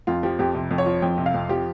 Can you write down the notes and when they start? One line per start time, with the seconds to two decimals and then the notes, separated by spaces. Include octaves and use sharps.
0.07 F2 F4
0.23 F3 G4
0.39 F2 G4
0.55 C3
0.71 F2
0.78 C#5
0.86 F3
1.02 F2 G5
1.18 C3
1.26 F5
1.34 F2
1.49 F3 G4